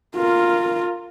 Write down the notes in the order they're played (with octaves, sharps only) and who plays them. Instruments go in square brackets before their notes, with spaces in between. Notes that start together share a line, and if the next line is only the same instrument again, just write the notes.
[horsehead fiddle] F4 A#4